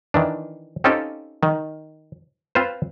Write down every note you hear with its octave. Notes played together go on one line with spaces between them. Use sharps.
D#3 E3 D4
C4 C#4 D#4 F4 G4 A4
D#3
C4 F4 B4 C5